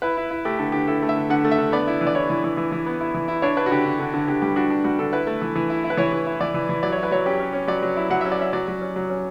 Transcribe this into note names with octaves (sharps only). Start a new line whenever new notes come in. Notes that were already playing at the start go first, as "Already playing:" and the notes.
E4 B4
E4
E4
A3 G4
D3 A4
D3 G4
E4 A4
A3
E5
D3
D3 F#5
A3
E5
D3
B3 D5
E4
E3
D5
E4 C#5
E3
E3
E3
E3
B3
E4
E3
E4
D4 C#5
D4 B4
F#4
D3 G4
D3
D3
D3
D3 G4
G3 G4
D4 F#4
D4
G3 F#4
D3 A4
E4 B4
A3
E3
E3
E4
E4
B4
E3 C#5
E3
E4
E3 D5
E3
E3
F#3 D5
C#5
E4
B4
F#3 C#5
C#4 G4
C#4
C#4
F#3 D5
F#3
E4
F#3 F#5
C#4 E5
D5
C#4 E5
F#3 D5
F#3
C#4
F#3
C#4